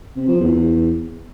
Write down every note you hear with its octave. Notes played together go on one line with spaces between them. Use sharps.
C3
F3
E2
E2